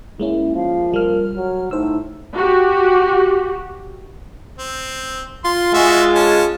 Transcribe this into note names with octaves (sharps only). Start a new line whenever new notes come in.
G#3 A#3 C#4 E4
F3 F5
G3 A#4 F6
F#3 C#5
A2 D#4 C5 E6
F#4 G4
C4
F4 C6
G#3 F#4 G#4 E5
C#4 A5